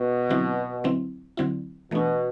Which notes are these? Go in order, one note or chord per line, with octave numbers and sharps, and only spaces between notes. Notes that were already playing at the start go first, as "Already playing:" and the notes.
Already playing: B2
D3 F#3 C4 E4
D3 F#3 C4 E4
D3 F#3 C4 E4
B2 E3 A3 D4